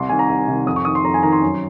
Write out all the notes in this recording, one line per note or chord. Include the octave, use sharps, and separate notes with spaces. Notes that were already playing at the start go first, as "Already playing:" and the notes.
Already playing: C2 C6
C3 D#3 G#5
A#5
C2
C3 D#3
F2 D#6
C#6
D#3 D#6
C6
F2 A#5
G#5
D#3 A#5
C6
F#2